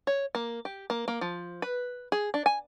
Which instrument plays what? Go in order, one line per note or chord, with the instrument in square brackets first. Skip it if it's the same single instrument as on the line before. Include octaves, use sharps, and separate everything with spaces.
[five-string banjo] C#5
A#3
G4
A#3
A#3
F3
B4
G#4
D4
G#5